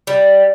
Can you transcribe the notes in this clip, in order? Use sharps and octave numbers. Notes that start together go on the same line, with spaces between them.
G3